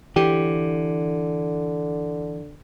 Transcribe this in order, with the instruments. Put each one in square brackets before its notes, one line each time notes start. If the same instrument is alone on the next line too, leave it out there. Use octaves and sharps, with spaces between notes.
[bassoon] D3 [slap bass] E3 [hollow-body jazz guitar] G4